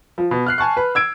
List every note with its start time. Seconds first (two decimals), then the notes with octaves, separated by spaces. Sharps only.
0.18 F3
0.31 B2
0.47 F6 F#6 C7
0.58 G#5 A5 C#6 F#6
0.77 B4
0.95 E6 G#6 D7